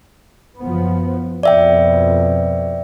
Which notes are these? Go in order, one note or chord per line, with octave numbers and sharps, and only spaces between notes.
F#1 F3 B3
F2 B2 D5 E5 G5